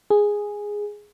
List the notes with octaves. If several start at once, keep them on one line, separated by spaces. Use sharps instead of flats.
G#4